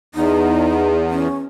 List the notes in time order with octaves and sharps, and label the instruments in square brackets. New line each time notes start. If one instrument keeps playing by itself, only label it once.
[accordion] E2 [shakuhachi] D#4
[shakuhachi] C#4